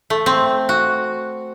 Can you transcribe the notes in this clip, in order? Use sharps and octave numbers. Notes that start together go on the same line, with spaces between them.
A3
C4
F#4